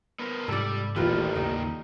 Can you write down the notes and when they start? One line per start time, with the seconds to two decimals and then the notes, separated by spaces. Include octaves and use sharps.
0.19 B3 A#4 C5
0.48 G#2 C3 G3 A4 D5
0.96 D#1 A1 D#3 E3 G3 F4 B4
1.36 D#2 C#3 D#4